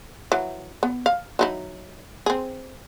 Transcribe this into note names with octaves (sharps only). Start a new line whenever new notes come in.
E3 F#3
B3
F5
F#3 D#4 E4
C4 G#4